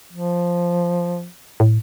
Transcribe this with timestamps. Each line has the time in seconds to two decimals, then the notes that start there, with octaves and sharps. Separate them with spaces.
0.12 F3
1.60 A2